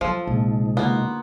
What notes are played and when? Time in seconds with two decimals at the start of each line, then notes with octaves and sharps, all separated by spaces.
0.01 F3 F#3 F4 A4
0.27 A#1 C3 G#3 D#4
0.77 D3 A#3 B3 F4